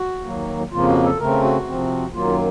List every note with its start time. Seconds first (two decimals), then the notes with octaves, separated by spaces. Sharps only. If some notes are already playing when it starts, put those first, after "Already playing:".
Already playing: F#4
0.25 D#2 D#3 F#3 A#3
0.71 F2 C#3 F3 A#3 F4
0.88 F#4
1.04 A4
1.19 C#3 A3 C4 A#4
1.43 F#4
1.66 C3 F3 C4
2.14 F#2 D#3 F#3 A#3 F4